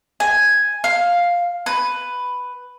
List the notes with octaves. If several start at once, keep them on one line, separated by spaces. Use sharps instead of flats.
G#5
F5
B4